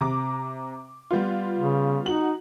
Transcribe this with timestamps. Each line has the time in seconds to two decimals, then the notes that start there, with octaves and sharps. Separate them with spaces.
0.01 C3 A#5 D6
1.11 G3 B3 F4
1.57 C#3
2.06 D#4 F#4 F#7